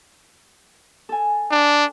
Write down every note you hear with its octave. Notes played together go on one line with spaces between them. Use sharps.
A4 G#5
D4